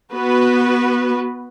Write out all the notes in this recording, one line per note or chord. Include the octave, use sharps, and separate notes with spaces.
B3 F#4 B4